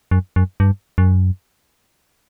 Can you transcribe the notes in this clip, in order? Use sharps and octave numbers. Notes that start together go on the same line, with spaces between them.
F#2
F#2
G2
F#2